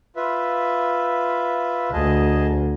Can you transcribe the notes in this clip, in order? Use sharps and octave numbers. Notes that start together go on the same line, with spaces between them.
F4 B4 E5
D2 G#4 D#5 A5